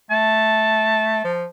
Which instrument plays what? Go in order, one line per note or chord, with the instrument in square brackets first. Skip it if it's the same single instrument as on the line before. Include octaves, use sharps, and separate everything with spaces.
[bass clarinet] A3 [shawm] A5
[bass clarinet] F3